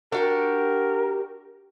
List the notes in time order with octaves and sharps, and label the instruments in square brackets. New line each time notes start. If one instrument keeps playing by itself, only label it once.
[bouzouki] D4 F#4 G4 [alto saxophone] A#4